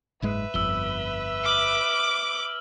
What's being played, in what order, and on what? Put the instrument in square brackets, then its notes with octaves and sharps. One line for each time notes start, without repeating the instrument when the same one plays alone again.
[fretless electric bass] F#1 G#2 G#3 [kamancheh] B4 E5
[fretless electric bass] G1 F2 [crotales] E6 G7
[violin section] D6 [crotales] F6 F#7